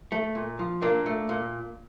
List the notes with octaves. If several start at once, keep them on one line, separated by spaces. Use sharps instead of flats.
A3
A#2
F3
A#2 A#3 D4
A3
A#2